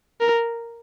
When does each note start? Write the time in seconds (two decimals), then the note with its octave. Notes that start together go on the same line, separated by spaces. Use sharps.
0.21 A#4